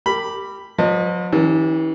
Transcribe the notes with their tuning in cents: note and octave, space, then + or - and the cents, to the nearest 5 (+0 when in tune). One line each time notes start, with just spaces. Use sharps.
G4 +0 A#4 -35 B5 +0
F3 +45 B4 +25 D#5 -35
E3 -40 C#4 +0 G4 -10